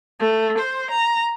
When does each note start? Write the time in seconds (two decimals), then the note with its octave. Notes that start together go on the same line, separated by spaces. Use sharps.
0.20 A3
0.58 C5
0.90 A#5